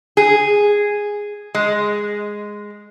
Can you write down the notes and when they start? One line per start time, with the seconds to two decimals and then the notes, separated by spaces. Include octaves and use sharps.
0.17 G#4
1.55 G#3